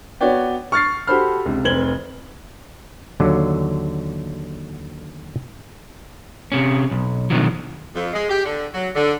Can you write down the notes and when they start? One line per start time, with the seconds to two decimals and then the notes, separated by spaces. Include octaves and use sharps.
0.21 B3 F#4 B4 C#5 D5 G5
0.72 C#6 F6 A6 C7
1.07 F#4 G4 A4 C5 B5 F6
1.46 C#2 C3
1.64 F1 C4 B4 G#6 F#7 G7
3.20 D#2 D3 F#3
6.52 C3 C#4
6.91 B1
7.30 B2 D3 D#3 F3 F#3
7.95 F2
8.13 G#3
8.29 G4
8.45 D3
8.74 F#3
8.95 D3